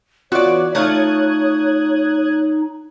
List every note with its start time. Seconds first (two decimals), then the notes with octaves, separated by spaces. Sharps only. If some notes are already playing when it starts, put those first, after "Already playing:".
0.32 E3 B3 F4 F#4 C#5 D5
0.75 A3 D#4 F4 D#6 F#6 G#6